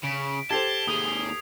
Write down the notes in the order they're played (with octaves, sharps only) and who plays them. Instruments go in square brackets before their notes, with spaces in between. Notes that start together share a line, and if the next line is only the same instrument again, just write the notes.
[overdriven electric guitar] C#3 [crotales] B6 D7
[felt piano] G4 A4 C5 [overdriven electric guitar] A5 [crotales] G#6 C7 F7 [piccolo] G7
[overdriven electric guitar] D#2 G#4 [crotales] D#6